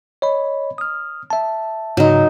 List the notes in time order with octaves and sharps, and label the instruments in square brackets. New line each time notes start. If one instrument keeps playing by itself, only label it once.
[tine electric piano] C#5 D#5 B5
D#6 F6
E5 A5
[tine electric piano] G#2 C#3 [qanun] F#3 D#4